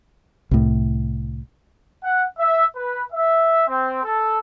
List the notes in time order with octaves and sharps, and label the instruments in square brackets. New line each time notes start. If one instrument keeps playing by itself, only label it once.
[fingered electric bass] C2 A2
[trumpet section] F#5
E5
B4
E5
C4
A4